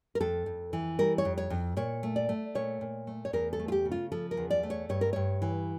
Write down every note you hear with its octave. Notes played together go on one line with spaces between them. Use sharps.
A#4
F2 A4
F2
E3
G3 A#4
C#5
F2
C#5
F2
A#2 C#5
A3
D5
A3
A#2 C#5
A#2
A3
C#5
E2 A#4
A4
A3
F4
G4
C#3
F4
F3 A4
A#4
E2
D5
A3
C#5
G2 C#5
A#4
G2 C#5
E3